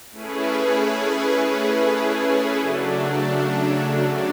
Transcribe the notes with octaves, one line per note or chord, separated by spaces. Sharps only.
A3 C#4 E4 G#4 B4
C#3 F#3 A3 D4